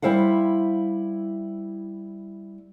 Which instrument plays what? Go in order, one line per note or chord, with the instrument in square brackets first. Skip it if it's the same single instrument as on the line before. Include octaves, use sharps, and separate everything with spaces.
[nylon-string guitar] G3 E4 C5 F5 F#5